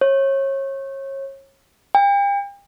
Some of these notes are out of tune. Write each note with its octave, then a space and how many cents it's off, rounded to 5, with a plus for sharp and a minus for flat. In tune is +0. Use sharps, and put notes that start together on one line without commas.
C#5 -30
G5 +40